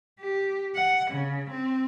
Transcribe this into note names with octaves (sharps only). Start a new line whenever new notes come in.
G4
F#5
C#3
C4